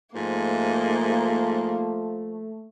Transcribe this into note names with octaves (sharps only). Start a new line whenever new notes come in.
G#2 F3 A3 A#3